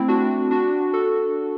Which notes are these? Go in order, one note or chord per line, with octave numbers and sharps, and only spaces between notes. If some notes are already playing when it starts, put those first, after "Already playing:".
Already playing: A3 C4 E4
D4 F#4
D4 F#4
F#4 A4